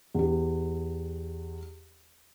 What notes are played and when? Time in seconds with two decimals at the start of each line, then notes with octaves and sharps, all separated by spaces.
0.14 E2 G4